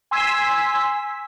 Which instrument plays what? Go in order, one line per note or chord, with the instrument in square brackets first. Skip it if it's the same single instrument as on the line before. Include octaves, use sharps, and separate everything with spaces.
[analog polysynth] G#5 C6 E6 B6